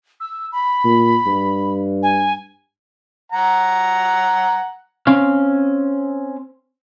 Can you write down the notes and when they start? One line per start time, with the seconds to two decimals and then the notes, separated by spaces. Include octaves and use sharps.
0.20 E6
0.52 B5
0.85 A#2
1.27 G2
2.02 G#5
3.32 F#5 A#5
5.07 C4 C#4 F5